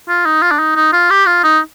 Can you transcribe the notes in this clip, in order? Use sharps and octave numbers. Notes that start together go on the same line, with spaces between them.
F4
D#4
F4
D4
D#4
D#4
F4
G4
F4
D#4